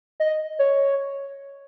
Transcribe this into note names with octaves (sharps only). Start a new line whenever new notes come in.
D#5
C#5